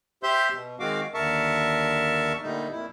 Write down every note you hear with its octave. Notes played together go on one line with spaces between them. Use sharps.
G4 C5 E5 C6 G6
B2
D#3 G#3 C4 F#4 F5 D6
D#2 D3 A#4 E5 A5 C#6
A#2 D3 G3 A3 D#4
F2 A#2 E4